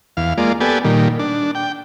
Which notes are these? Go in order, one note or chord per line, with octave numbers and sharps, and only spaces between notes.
E2 F5
G#3 A#3 F4 D5
B3 G4 A4 D5 G#5
A#2 D#3 G3
D4
G5